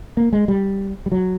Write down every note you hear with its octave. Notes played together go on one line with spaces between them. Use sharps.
A#3
G#3
G3
G3
F#3